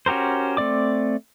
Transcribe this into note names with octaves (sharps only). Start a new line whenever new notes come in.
C#4 F#4 G4 A#4 C5
A3 C4 D5 D6